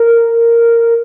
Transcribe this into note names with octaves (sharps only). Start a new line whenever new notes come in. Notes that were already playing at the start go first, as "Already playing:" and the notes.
Already playing: A#4